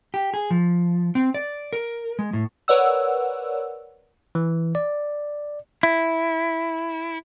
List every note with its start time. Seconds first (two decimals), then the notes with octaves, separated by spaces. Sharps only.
0.14 G4
0.34 G#4
0.51 F3
1.15 C4
1.34 D5
1.73 A#4
2.19 G#3
2.33 A2
2.68 A#4 B4 C#5 D5 F#5 E6
4.35 E3
4.75 D5
5.83 E4